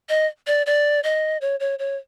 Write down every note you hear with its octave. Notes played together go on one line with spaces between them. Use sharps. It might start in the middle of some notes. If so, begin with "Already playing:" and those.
D#5
D5
D5
D#5
C#5
C#5
C#5